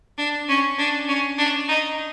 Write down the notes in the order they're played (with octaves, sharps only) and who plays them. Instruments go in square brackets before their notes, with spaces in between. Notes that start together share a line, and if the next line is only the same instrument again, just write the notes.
[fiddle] D4
C#4
D4
C#4
D4
D#4